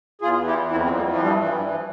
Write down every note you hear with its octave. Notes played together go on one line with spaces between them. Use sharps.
E2 F4 G#4
E3
E4 G4
E2
F2 C4 E4
G#3 C4
F2
G3 A#3
E3
F3
G2 G3
E3
G3
G2
F3